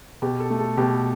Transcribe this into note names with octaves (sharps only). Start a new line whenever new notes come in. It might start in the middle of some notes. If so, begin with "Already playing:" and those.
B2 G4
A4
A3
A4
B2 G4